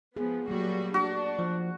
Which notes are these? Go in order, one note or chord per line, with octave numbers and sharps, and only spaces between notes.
F3 B3 G#4
F#3 G3 A3 A#3 F#4
D4 F#4
F3